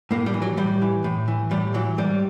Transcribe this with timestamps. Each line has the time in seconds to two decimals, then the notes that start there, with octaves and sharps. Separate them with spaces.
0.11 A2 A#3
0.26 G3
0.34 E3
0.42 F#3
0.57 A2 G3
0.82 E3
1.04 A2
1.28 E3
1.51 A2 G3
1.74 E3 F#3
1.98 G#2 G3